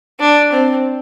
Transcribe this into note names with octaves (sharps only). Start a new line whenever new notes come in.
D4
C4